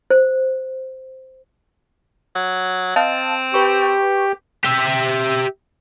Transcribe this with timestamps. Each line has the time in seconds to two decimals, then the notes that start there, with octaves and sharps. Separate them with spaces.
0.10 C5
2.35 F#3
2.96 C4 D#5 F5 A5
3.54 G4 B4 C#6
4.65 G4 E5